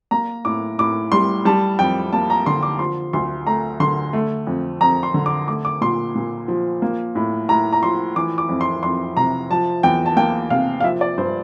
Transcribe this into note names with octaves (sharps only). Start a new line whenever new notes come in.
A#3 A#5
A2 D6
A2 D6
G3 C6
G3 A5
F2 G5
A#3 A5
A#5
D3 C6
D6
F3 C6
D2 C6
A3 A#5
D3 C6
A3
F2
F2 A#5
C6
D3
D6
A3 D6
D6
A#2 C6
A#2
F3
A#3
A2
A2 A#5
A#5
F3 C6
E3 D6
D6
F2
C6
F2 C6
C3 A#5
F3 A5
E2 G5
A5
A#3 G5
C3 F5
F5
F3 E5
D5
G2 C5